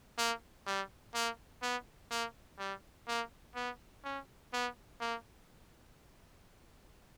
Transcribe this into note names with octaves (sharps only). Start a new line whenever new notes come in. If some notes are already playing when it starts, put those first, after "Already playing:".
A#3
G3
A#3
B3
A#3
G3
A#3
B3
C#4
B3
A#3